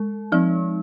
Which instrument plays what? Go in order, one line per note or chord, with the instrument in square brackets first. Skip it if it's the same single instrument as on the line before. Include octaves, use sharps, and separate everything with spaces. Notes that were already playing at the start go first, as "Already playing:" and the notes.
Already playing: [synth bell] G#3
[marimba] F3 [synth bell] C4 D#4